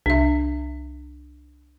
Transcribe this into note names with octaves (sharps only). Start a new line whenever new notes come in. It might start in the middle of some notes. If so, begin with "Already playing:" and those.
C2 D4 E5